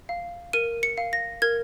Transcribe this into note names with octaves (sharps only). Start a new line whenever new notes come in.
F5
A#4 D#7
C#7
F5
A#6
A#4 G#6